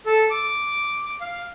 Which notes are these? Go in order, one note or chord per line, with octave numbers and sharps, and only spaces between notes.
A4
D6
F5